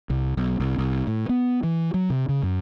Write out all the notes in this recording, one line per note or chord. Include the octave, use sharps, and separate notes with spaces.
C2
B1
C2
C2
A2
B3
E3
F#3
C3
C#3
F#2